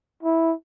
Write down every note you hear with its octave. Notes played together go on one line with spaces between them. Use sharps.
E4